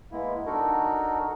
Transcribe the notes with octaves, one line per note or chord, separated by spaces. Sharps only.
G#3 A#3 B3 E4
D4 D#4 F#4 A4 A#4